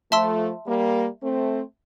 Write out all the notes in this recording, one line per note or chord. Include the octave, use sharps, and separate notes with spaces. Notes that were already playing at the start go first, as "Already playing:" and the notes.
F3 A3 E5 A5 C6 E6
G3 A#3
A3 C4